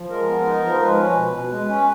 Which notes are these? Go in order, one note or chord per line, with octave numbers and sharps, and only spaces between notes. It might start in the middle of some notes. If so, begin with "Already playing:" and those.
Already playing: F3
G#3 A#4
B3
D#4
F3
G#3 B4
C#4
B2
B2
G#3
C#4